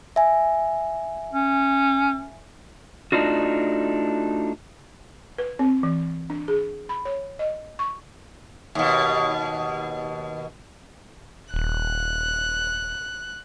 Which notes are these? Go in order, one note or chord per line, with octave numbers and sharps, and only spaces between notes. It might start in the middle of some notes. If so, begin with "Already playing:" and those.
E5 G#5
C#4
A3 D4 D#4 F4 F#4
B4
C4
E3
D4
G#4
B5
C#5
D#5
C#6
D#2 B2
D#1 F#6